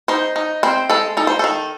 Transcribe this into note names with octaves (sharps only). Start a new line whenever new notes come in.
D#4 C5
D#4
C4 C5
G#3 A4
D#4 A4
C5
D#3 A4